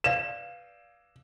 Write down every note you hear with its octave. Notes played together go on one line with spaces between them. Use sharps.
B4 D5 F5 E7